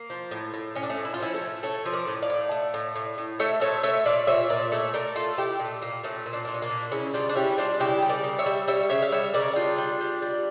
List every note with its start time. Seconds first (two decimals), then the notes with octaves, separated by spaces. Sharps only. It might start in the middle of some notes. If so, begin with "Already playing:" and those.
Already playing: A#3
0.10 F3
0.31 A2
0.54 A2
0.75 A2 C#4
0.83 D4
0.90 A3 C#4
0.98 A2
1.05 E4
1.14 F4
1.20 F3 C#4 E4
1.34 A4 C#5
1.41 A3
1.63 A3 A4 C#5
1.85 F3
1.93 A#4 D5
2.08 A2
2.22 D5 F5
2.30 A2
2.51 A3
2.74 A2
2.96 A2
3.18 A2
3.40 A3 C#5 E5
3.61 A#2 A4 C#5
3.83 A3 C#5 E5
4.05 A#2 D5 F5
4.27 A#2 C#5 E5
4.49 A#2 A#4 D5
4.72 A3 A4 C#5
4.94 A3 A#4 D5
5.16 A3 F4 A4
5.38 A3 E4 G4
5.59 A#2 A3
5.82 A#2 A#3
6.04 A#2 A3 C#4
6.26 A#2
6.33 A#3 D4
6.45 A#2 A#3
6.54 C#4
6.62 A#3 D4
6.70 A#2
6.91 C#3 C#4 E4
7.13 G3 D4 F4
7.29 D4
7.36 G3 C#4 E4
7.58 G3 D4 F4
7.80 C#3 E4 G4
8.02 G3
8.09 A#4 D5
8.24 C#3
8.39 C#5 E5
8.46 G3
8.68 G3 C#5 E5
8.90 C#3 C#5 E5
9.02 F5
9.12 G3 C#5 E5
9.34 C#3 A#4 D5
9.56 G3 D4 F4
9.78 G3
10.00 G3
10.22 G3